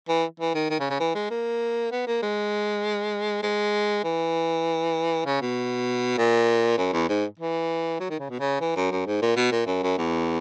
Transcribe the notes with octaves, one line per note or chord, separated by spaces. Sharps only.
E3
E3
D#3
D#3
C#3
C#3
E3
G#3
A#3
B3
A#3
G#3
G#3
E3
C#3
B2
A#2
F#2
E2
G#2
E3
F#3
D#3
C#3
B2
C#3
E3
F#2
F#2
G#2
A#2
B2
A#2
F#2
F#2
E2